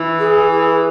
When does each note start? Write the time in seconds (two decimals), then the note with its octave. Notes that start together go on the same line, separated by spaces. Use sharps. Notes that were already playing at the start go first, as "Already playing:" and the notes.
Already playing: E3
0.19 G#4
0.51 G#4